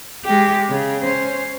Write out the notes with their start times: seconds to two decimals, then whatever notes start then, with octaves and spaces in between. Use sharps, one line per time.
0.24 G#3 G4
0.70 C#3
1.02 C#4 C5